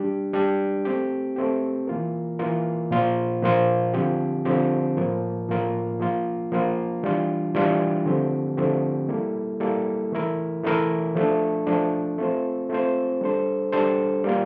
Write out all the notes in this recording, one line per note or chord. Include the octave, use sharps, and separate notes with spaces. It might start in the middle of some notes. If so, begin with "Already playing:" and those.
Already playing: G3 D4 G4
G3 D4 G4
A3 C4 G4
A3 C4 G4
E3 A#3 F4 A#4
E3 A#3 F4 A#4
A#2 F3 A#3 F4 C5
A#2 F3 A#3 F4 C5
D3 F3 C4 G4
D3 F3 C4 G4
A2 F3 A#3 F4 A#4
A2 F3 A#3 F4 A#4
F3 A#3 F4
F3 A#3 F4
E3 G3 D4 F4
E3 G3 D4 F4
D3 F3 A3 C4 G4
D3 F3 A3 C4 G4
G3 A#3 E4 A4
G3 A#3 E4 A4
E3 A3 E4 A#4
E3 A3 E4 A#4
F3 A3 D4
F3 A3 D4
A3 C4 F4 C5
A3 C4 F4 C5
G3 D4 A4 C5
G3 D4 A4 C5
G3 A#3 F4